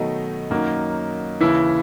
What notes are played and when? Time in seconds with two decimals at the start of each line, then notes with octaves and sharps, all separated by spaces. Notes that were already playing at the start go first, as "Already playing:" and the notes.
Already playing: B2 D#3 F#3 A3 D#4
0.51 F#2 D#3 F#3 A#3
1.40 D#2 C#3 E3 E4